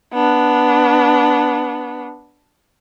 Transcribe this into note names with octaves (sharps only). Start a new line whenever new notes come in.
B3 D4